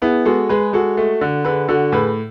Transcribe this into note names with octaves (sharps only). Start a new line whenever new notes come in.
B3 E4 G#4
G#3 F#4 A4
G#3 G#4 B4
G#3 F#4 A4
A3
D3
D3 G#4 B4
D3 F#4 A4
A2 G#4 B4